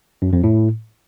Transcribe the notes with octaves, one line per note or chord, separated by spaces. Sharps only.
F#2
F2
A2